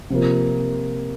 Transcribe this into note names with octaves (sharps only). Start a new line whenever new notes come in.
C3 F3 A#3